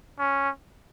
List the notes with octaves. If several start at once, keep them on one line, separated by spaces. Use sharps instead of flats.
C#4